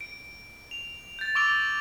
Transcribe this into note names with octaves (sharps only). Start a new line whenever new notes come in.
D7
F7
G6 A6
C#6 D6 E6 D7 F7 G7